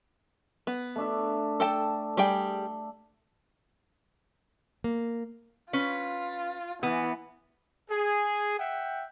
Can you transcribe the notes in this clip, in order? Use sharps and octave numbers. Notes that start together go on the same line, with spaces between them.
B3
A3 D4 E5
A4 G5 A5
G3 G#4 G5
A#3
C#4 F4 B4
E3 B3
G#4
E5 F#5 G5